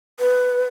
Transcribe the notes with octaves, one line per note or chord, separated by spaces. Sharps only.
B4